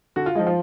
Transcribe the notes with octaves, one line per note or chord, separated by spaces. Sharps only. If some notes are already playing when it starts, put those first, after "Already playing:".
D3 F#4
F4
F3 G#3 D#4
F3 F4